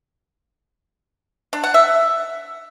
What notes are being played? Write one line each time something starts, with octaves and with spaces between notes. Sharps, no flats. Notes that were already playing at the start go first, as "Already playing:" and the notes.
D4
F#5
E5